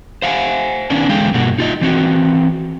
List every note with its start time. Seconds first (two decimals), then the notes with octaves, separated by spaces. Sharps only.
0.22 C5 F5 F#5 G#5
0.90 D#3 B3 C#4 D4
1.08 E2 D3 G#3 F5 G5
1.34 G2 B2 A#3 F#4
1.58 D#4 F4 D#5
1.81 E3 C4 F#4